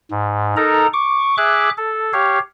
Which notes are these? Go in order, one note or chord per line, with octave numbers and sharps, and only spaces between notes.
G#2
D#4 A4 A#4 A#5
C#6 D6
G#4 E5 D6 F#6
A4
G4 C#5 F5